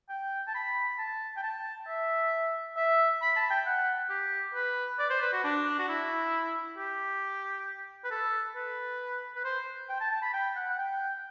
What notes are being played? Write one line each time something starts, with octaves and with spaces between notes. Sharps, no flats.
G5
A5
B5
A5
G5
A5
E5
E5
B5
A5
G5
F#5
G4
B4
D5
C5
B4
F#4
D4
F#4
E4
G4
B4
A4
B4
B4
C5
G5
A5
A5
B5
G5
F#5
F#5
G5